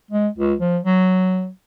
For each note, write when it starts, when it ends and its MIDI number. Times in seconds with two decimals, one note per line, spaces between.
0.11 0.28 56
0.38 0.54 37
0.60 0.78 53
0.84 1.48 54